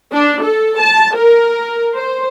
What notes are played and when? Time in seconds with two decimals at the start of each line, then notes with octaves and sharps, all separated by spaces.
0.12 D4
0.42 A4
0.80 A5
1.16 A#4
1.95 C5